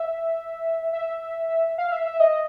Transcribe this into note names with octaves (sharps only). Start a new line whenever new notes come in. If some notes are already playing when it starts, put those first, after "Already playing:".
Already playing: E5
E5
F5
E5
E5
D#5